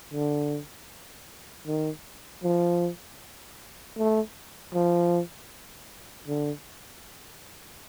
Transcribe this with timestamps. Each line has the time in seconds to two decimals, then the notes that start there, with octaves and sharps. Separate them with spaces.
0.13 D3
1.67 D#3
2.44 F3
3.98 A3
4.74 F3
6.28 D3